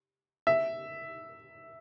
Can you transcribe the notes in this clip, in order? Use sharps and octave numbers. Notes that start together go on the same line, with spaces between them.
E5